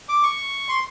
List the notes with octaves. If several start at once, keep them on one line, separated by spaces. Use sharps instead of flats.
D6
C#6
C6